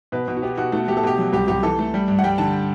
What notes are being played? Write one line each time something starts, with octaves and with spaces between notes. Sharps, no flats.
B2 B4
B2
F#4
B3 G4
B2 F#4
A3 F#4
A3 G4
A4
B2 G4
F#3
C2 G4
C2 G4
E3 A4
A3
G3
G2
F#5
G3 G5
D3 A5